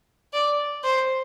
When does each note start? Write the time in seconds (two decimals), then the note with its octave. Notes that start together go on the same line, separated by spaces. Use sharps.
0.33 D5
0.84 C5